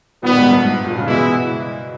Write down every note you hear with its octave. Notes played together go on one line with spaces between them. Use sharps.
A#2 D#3 G3 B3
G#2
G2
G#2
A#2
C#3
B2 E3 G#3 B3 E4